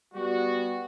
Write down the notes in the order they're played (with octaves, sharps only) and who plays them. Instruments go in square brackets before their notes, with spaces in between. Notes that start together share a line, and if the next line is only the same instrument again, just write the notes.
[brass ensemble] G3 B3 F#4